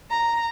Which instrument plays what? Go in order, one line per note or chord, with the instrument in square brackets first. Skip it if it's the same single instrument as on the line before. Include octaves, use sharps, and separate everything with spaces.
[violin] A#5